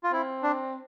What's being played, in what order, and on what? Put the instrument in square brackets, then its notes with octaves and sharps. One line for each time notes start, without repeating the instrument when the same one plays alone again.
[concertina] F4
[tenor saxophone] C4 [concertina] E4
[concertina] D4